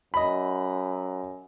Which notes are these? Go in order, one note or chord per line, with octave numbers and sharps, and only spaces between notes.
F#2 D#5 B5